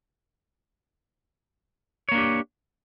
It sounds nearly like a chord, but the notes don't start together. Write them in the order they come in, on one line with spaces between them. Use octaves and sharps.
C#5 A#3 D4 G4